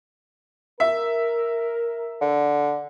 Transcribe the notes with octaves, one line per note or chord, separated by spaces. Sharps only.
A#4 E5
D3